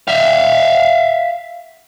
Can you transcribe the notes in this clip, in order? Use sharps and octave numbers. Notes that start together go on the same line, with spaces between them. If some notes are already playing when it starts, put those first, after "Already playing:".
E5 F5